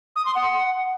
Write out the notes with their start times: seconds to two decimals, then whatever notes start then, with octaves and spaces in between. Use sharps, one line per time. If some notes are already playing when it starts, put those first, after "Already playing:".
0.16 D#6
0.25 C6
0.35 F#5